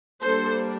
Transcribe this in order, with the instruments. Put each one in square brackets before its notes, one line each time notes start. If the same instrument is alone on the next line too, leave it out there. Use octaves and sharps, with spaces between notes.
[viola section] G3 A#3 D4 A4 C5